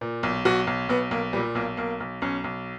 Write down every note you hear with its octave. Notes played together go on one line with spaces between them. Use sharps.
A#2
B1
B1 F#4
B1
B1 B3
B1 A#3
A#2 G3
B1 A#3
B1 A#3
B1
B1 C#4
B1